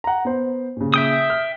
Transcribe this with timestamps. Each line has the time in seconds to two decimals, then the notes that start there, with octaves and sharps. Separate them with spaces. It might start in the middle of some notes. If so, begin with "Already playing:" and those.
0.04 F#5 A#5
0.25 B3 C5
0.77 A#2 C#3
0.94 E5 G5 D#6
1.30 F6